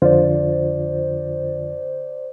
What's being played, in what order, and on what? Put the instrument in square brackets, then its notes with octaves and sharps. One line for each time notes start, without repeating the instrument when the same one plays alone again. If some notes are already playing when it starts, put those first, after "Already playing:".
[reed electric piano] F2 D3 F4 [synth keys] C5 D5